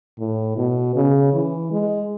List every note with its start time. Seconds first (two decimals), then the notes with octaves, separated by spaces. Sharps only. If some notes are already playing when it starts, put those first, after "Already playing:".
0.19 A2
0.57 B2
0.95 C#3
1.33 E3
1.72 G#3